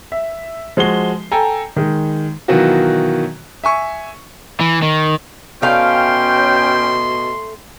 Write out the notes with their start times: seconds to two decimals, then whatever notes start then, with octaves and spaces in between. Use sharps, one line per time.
0.12 E5
0.77 F3 G#3 F#4 C7 G7
1.32 A4 G5 G#5 A#5
1.76 D#3 G#3
2.48 B2 D#3 E3 F#3 F4 F#4
3.64 E5 G#5 C#6
4.60 E3
4.82 D#3
5.62 B2 A3 C#4 F5 G5 C6